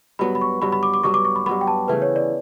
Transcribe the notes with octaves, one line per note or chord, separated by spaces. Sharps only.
G2 F#3 B3 B5
B5
C#6
G2 F#3 B3 B5
B5
D6
D6
G2 F#3 B3 C#6
D6
C#6
B5
G2 F#3 B3 B5
G5
A5
C#3 E3 A3 B4
C#5
D5